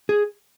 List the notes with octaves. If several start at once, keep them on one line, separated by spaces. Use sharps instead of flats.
G#4